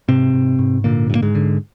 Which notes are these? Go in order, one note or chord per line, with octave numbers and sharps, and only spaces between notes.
G#2 C3 C4
G#2
G#2
A#2 D3 A#3
G2
A#3
G#2 G#3
D3